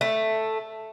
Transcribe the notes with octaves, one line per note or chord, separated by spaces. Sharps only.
A3